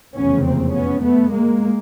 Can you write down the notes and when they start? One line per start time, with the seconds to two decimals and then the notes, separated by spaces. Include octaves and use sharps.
0.15 F1 E2 C#3 B3 C#4
0.44 A#3 C4
0.74 B3 C#4
1.03 A3 B3
1.32 G#3 A#3